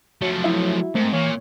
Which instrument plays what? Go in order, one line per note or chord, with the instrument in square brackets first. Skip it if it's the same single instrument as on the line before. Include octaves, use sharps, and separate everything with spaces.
[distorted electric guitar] F3 A3 [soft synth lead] F#3
[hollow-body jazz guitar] E4 E5
[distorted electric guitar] G#2 [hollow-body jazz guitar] A3 A#3 [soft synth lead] C4
[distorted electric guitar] A#2 [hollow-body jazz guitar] E3 [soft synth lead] C#5